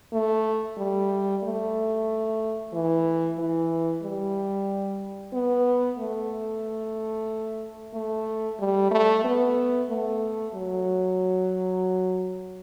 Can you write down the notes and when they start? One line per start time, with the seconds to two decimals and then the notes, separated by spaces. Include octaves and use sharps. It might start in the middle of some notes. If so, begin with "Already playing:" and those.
0.13 A3
0.78 G3
1.43 A3
2.73 E3
3.38 E3
4.03 G3
5.33 B3
5.99 A3
7.94 A3
8.60 G3
8.91 A3
9.25 B3
9.90 A3
10.54 F#3